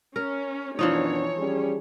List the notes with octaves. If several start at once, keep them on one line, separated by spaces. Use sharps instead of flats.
C#4 A#4
F#2 B2 E3 F3 D4 D#4 C#5
G3 C#4 G#4